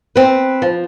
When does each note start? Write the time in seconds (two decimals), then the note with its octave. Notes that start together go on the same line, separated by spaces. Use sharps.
0.16 C4 B4
0.62 F3